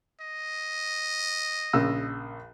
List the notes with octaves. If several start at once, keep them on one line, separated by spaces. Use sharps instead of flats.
D#5
A#1 C#3 E6